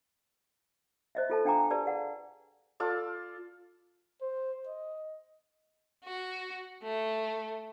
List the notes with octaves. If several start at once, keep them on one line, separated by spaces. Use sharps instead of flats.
C5 D#5 E5
F4 A4 A5
D4 F5 G5 G#5 A#5 D6
G4 B4 D5 A5
G#4 F5 F#5
F4 A4 D5
C5
D#5
F#4
A3